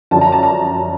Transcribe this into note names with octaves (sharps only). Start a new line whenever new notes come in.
F#2 D3 F3 A5
A#5
A5
A#5